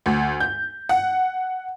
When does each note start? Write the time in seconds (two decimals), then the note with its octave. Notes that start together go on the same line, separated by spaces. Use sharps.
0.06 D2
0.40 G6
0.89 F#5